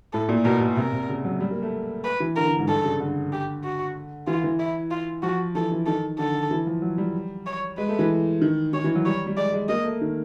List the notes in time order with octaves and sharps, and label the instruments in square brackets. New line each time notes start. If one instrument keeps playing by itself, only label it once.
[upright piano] A2 [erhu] A4
[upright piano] A#2
[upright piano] B2 [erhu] A#4
[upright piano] B2
[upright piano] C3 [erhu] A#4
[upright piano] C3
C#3
F#3
G3
A#3
A3
[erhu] B4
[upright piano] E3
[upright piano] D3 [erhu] A#4
[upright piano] D3
G#2
[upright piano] G2 [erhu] A4
[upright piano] C#3
D3
[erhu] G4
F#4
[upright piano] E3 [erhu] F4
[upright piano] E3
[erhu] E4
F4
[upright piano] F3 [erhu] F#4
[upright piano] E3 [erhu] A4
[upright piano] E3
[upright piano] D#3 [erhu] A4
[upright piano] D3 [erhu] A4
[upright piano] E3
F3
F#3
G3
[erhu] C#5
[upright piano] G#3 [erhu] B4
[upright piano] A3
E3
D#3
[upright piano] D#3 [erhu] C#5
[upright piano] E3
F#3
[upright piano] G3 [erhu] C#5
[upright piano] G3
[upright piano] G#3 [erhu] D5
[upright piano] G#3
[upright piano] A#3 [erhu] D#5
[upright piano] A3
D#3